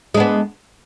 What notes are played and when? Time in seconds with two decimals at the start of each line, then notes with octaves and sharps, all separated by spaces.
0.14 G#3
0.17 D4
0.20 B3